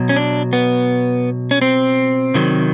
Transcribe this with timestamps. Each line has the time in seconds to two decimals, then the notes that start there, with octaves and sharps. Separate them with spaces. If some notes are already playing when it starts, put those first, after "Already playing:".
Already playing: B2 F#3
0.09 C#4
0.16 D4
0.53 B3
1.51 C#4
1.62 C4
2.34 C3 D#3 F#3